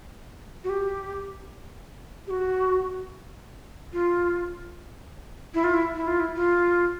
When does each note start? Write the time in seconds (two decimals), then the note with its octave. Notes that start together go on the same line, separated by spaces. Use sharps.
0.64 F#4
0.69 G4
2.27 G4
2.30 F#4
3.93 F4
5.54 E4
5.64 F4
5.74 E4
5.95 E4
6.07 F4
6.20 E4
6.36 F4